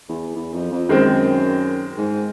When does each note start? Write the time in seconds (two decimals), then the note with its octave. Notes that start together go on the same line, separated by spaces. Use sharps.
0.09 E2
0.35 E2
0.53 F2
0.72 F2
0.89 F#2 D#3 G#3 C4
1.97 G#2